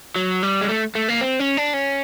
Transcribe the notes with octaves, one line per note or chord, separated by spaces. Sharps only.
F#3
G3
G#3
A3
A3
A#3
C4
C#4
D4
C#4